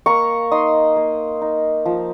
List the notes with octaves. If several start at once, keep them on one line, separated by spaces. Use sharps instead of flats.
A#3 A#5 C#6
D#4 C6 D#6
A#3
D#4
F3